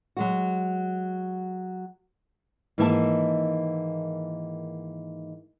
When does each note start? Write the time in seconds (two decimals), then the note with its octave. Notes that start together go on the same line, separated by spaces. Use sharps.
0.17 F#3 G#3 F#4
2.78 G#2 D#3 E3 A#3 E5 A5